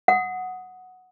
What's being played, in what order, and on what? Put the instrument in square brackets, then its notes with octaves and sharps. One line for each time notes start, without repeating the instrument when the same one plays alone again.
[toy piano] F#5 D#6